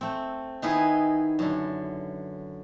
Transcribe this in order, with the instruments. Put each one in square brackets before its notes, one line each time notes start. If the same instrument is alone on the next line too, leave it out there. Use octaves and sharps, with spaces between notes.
[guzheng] A3 C4
D#3 B3 E4 G#4 B4 D#5
F#2 D3